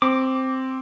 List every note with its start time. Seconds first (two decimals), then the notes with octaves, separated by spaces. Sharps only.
0.02 C4 D6